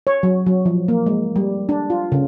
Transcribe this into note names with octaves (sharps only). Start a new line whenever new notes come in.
C#5
F#3
F#3
F3
A#3
G#3
G3
D4
F4
C#3